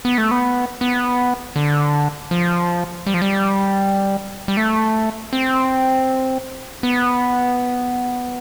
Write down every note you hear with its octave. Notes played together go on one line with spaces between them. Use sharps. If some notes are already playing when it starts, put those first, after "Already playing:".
B3
A3
B3
B3
D3
F3
G3
F3
G3
G3
A3
C4
B3